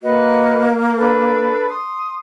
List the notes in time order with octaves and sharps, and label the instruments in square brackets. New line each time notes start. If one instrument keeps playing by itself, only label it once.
[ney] A#3 [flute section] F#4 B4 D#5
[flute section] D4 A4 B4
C6 D#6